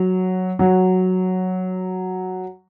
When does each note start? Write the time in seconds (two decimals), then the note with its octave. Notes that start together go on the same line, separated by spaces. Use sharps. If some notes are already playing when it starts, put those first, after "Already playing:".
Already playing: F#3
0.59 F#3